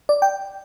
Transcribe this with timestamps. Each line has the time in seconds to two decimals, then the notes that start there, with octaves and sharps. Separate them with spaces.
0.09 D5
0.22 G5